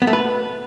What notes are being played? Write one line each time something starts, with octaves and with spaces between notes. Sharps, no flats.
B3
A3
B4